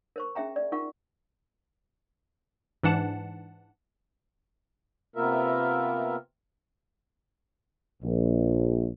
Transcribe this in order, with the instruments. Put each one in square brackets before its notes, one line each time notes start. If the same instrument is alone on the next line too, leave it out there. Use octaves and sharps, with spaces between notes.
[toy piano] A#4 C5 C#6
C#4 G#4 E5 G5 A#5
D5
D#4 F4 A#4 F#5 C#6
[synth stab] G#2 E3 D4 F#5 A5
[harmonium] C3 A#3 B3 F4 A#4 E5
[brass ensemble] A#1